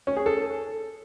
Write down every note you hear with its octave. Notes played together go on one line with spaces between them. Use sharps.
C#4
G#4
A4